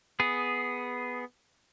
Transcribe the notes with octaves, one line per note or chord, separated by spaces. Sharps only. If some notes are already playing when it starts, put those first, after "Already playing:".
B3 G#4